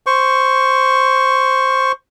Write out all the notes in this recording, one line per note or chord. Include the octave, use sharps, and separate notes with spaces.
C5 C#6